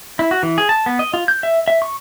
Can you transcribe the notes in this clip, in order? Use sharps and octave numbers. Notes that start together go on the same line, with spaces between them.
E4
F#4
E3
G#4
A5
B3
D#5
F4
G6
E5
E5
C#6